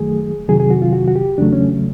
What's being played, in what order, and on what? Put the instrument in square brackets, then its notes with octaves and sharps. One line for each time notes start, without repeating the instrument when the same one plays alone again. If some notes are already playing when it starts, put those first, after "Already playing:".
Already playing: [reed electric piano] F#2 D#3 F#3 A3 G#4
F2 C3 D#3 F#3 G#4
G#4
F#4
F4
F#4
F#4
G4
E2 C#3 F#3 A3 D4
C#4